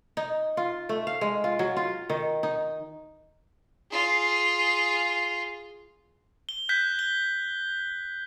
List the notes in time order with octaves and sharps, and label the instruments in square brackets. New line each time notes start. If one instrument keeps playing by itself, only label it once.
[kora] D#4
F4
A3
F5
G#3
F4
F#3
F4
D#3
D#4
[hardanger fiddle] F4 G#4
[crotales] G7
F#6 G6 B6
G7